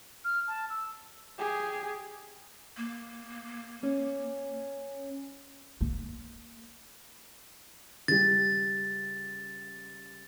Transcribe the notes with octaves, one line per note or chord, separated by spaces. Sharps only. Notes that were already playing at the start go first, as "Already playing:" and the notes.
F6
A5
E6
G4 G#4
A#3
C#4
A#3 C4
C#2 G3 A6